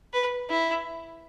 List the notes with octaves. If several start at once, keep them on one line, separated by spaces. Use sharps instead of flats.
B4
E4